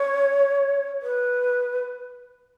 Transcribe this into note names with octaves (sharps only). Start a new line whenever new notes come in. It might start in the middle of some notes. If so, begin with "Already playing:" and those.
Already playing: C#5
B4